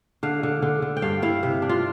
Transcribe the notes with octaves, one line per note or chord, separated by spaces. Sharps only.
D3 F5
D3
D3
D3
G5
G2 F5
E4 F5
C3 E5
D4
F4